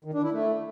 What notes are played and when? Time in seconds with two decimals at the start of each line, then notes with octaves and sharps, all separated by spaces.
0.05 D#3
0.14 D4
0.23 E4
0.33 A3